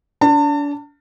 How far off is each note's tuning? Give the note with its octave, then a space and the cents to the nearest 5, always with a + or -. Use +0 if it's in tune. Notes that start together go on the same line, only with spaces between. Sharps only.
D4 -35 A5 +35